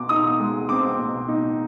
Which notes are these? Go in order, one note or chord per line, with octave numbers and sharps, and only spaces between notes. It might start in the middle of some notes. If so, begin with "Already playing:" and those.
Already playing: B2 D6
D#4 D#6
G#3
C4 D6
B2
D#4